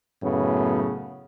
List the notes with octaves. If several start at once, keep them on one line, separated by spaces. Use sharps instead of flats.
F#2 A2 C#3 B3